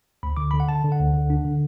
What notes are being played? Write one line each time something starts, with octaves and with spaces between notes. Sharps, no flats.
D2 B5
D3 D6
D3 B5
F#5
D3 A5
D3
F#5
D2
D3
D4
D3